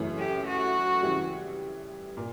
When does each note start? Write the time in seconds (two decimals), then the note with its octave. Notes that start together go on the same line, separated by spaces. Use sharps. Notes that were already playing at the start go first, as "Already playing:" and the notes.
Already playing: F#2 C#3 E3 A3 C#4
0.18 G4
0.47 F#4
1.02 C#3 E3 G3
2.17 A#2